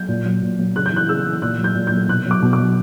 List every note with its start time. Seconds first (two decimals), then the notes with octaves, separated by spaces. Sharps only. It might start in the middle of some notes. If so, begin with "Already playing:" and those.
Already playing: F#3 G6
0.08 A#2
0.26 F#3
0.42 A#2
0.59 F#3
0.76 C#3 F#6
0.86 G6
0.92 E3 F#6
1.09 C#3 E6
1.26 E3
1.42 A#2 F#6
1.59 F#3
1.64 G6
1.75 A#2
1.87 F#3 G6
2.08 B2 F#6
2.26 F#3
2.31 D6
2.42 B2
2.53 D6
2.59 F#3